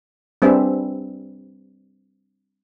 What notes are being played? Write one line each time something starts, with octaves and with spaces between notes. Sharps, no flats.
G3 C4 D4 G#4 B4 E5